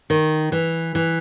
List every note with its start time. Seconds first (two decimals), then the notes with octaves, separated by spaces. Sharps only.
0.10 D#3
0.52 E3
0.95 E3